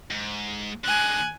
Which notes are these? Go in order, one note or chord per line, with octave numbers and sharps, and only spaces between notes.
G#2
D3 G#3 G#5 F#6